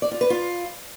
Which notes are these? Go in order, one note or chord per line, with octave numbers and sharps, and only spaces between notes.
D5
F4
B4
F4